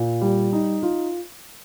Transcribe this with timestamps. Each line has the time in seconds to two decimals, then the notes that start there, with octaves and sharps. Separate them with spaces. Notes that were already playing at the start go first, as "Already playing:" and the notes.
Already playing: A#2
0.21 G3
0.53 D#4
0.83 F4